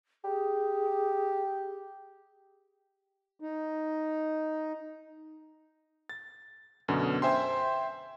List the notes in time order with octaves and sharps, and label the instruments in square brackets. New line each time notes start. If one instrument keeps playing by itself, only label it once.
[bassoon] G4 [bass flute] G#4
[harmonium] D#4
[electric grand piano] A6
F#2 B2 D3
C5 E5 G5 G#5 C6